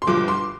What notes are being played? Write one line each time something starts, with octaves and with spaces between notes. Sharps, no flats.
C6
G1 G2 F3 D6
C6